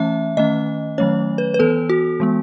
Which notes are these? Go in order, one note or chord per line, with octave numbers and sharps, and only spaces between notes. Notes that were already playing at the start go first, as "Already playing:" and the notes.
Already playing: E3 A3 C#4 E5
D#3 A3 C#4 D#5
D#3 F#3 A3 C#4 C#5
B4
B4
E3 B3 A4
F#4
E3 G#3 B3